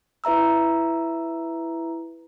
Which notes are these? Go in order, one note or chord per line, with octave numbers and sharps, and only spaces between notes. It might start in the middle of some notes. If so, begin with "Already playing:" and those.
E4 B4 E5 A#5 E6